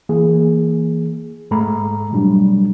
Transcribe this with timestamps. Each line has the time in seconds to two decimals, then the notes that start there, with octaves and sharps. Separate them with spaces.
0.09 E3 A#3 G#4
1.51 G#2 G#3 A3 A4 A#5 B5
2.12 B2 F#3 G3 D4